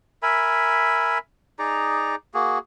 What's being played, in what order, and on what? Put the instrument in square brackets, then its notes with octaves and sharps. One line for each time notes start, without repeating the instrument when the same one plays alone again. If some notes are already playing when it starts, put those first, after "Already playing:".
[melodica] A#4 E5 G#5 B5
D#4 G#4 D5 A#5
A#3 F#4 G#4